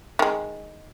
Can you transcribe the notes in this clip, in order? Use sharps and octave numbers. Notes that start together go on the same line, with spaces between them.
D#3 G#3